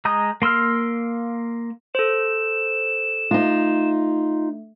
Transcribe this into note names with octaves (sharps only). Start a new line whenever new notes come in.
G#3 A#5 D#6 G6
A#3 C6 E6 F6
A4 C5 E7
A3 D#4 F4